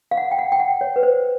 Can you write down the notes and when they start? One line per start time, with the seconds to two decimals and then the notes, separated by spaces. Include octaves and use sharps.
0.11 F5
0.17 F#5
0.31 G5
0.39 F#5
0.52 G5
0.60 F#5
0.81 C#5
0.96 B4
1.03 C5